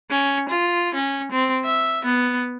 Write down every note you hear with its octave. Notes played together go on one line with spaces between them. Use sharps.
C#4
F4
C#4
C4
E5
B3